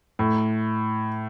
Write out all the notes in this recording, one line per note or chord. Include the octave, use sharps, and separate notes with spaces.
A2